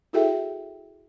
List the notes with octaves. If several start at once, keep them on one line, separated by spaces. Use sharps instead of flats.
E4 F#4 G#4 A4 E5 G5